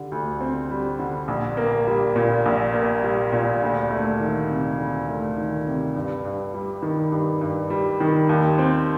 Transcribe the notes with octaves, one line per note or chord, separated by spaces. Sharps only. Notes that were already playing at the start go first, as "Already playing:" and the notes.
Already playing: D3 G3
D2
C4
G3
D3
A#1
A#3
G3
A#2
A#1
A#3
G3
A#2
D2
A3
D#3
C3
D2
A3
D#3
C3
G2
G2
G3
D#3
G2
G2
G3
D#3
D#2
C4